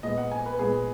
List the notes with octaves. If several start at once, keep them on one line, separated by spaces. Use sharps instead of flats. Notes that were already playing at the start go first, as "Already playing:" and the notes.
A#2 G#3 B3 D#5
F#5
G#5
B4
A#2 G#3 B3 G#4